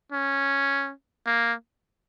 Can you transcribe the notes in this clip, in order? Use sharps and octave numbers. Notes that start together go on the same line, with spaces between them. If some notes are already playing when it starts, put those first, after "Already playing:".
C#4
A#3